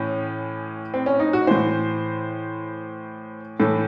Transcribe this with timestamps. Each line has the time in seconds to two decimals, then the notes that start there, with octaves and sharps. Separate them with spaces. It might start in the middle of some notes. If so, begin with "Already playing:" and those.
Already playing: A2 E3 C#4
0.94 C4
1.06 C#4
1.20 D#4
1.33 F#4
1.47 A2 E3 C5
3.60 A2 E3 A4